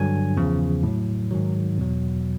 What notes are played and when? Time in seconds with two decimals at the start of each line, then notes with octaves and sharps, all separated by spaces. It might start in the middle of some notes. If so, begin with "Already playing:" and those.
Already playing: G2 D3 F#3 G#5
0.37 E2 C#3 F3
0.83 A2 F#3
1.31 G#2 D#3 F#3
1.77 E2 B2 F#3